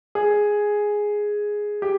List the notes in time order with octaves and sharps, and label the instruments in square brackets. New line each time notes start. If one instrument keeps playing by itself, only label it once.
[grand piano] G#4
G4